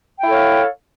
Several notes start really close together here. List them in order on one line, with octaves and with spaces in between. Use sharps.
G5 E4 A4 C#5 F5